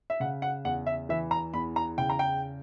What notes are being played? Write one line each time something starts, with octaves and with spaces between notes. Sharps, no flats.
E5
C#3 F#5
F#5
E2 F#5
E5
E3 E5
A#5
E2 B5
A#5
C#3 G5
A#5
G5